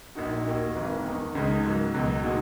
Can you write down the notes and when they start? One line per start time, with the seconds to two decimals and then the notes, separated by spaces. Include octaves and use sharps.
0.15 A#1 A#2 A#3 D#4 F#4
0.45 D#2 D#3 A#3 D#4 F#4
0.75 G#1 G#2 E3
1.04 E2 D#3 A#3 D#4
1.35 C#2 C#3 G#3 D#4
1.64 G#2 F#3 A#3
1.94 C#2 B2 F#3
2.24 A#2 G#3 D#4 F#4